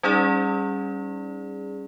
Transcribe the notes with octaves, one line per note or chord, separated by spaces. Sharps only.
G3 C#4 D#4 G#4 D5